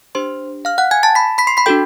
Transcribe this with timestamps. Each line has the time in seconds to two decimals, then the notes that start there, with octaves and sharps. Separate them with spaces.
0.15 D4 G4 C5 C6
0.65 F5 F6
0.78 F#5 F#6
0.91 G#5 G#6
1.03 A5 A6
1.15 B5 B6
1.38 B5 B6
1.47 C6 C7
1.57 B5 B6
1.66 D4 F#4 A4 G5 G6